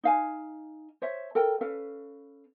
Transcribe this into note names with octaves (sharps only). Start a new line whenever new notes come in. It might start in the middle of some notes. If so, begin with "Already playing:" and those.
D#4 F5 G#5
C5 C#5 E5
A4 A#4 G5
C#4 A4 B4 F5